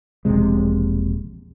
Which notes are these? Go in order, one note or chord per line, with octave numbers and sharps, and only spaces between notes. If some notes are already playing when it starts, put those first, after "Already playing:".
E1 A#1 C3 G#3